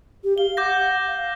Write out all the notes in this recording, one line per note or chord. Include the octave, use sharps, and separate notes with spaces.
G4
F5 G7
F#5 D6 G6 A#6
F5